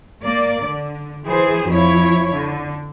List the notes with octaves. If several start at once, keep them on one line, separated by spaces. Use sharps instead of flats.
A#3 D5
D3
E3 G#4 C5
F2 F3 E4 C#5
D3